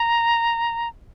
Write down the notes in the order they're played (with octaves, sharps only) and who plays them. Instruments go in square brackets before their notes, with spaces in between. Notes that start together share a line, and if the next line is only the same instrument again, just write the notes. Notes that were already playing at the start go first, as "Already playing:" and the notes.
Already playing: [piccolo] A#5